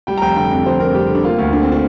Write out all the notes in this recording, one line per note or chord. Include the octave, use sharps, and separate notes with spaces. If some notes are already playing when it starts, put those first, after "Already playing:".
G3 G5
A#5
F1 G5
D3 G5
F2
F1 C5
F2 A#4
G3 G4
D3
D4
A#3 F4
D2
D3 D4
C4
D4